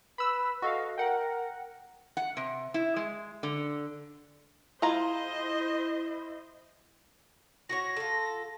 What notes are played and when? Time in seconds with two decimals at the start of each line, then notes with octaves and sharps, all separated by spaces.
0.18 B4 B5 E6
0.62 F#4 A4 D#5 F5
0.98 A#4 F#5 G5
2.17 F#5
2.37 C3
2.74 E4
2.96 G#3
3.43 D3
4.82 G#3 E4 F4 C5 D#5 A#5
7.69 F#4 A4 C#5 A#6
7.97 F4 A4